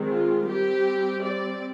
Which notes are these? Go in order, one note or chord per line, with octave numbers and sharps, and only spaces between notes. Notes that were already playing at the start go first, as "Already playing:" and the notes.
Already playing: D#3 G#3 C4
F4
G3 C4 G4
D5